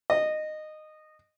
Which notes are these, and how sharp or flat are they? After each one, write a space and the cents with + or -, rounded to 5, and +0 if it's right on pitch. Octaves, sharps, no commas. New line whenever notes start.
D#5 -15